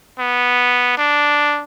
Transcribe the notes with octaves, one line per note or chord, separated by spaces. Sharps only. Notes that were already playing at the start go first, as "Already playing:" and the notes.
B3
D4